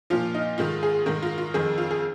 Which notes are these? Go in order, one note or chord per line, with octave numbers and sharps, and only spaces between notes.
A#2 F3 F4
D#4
G#2 D#3 F4
G#4
G#2 D#3 A#4
F4
F4
F2 D#3 G#4
F4
G#4